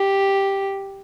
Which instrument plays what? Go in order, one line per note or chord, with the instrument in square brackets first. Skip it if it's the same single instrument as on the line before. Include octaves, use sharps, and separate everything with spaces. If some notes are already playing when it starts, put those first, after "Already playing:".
Already playing: [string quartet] G4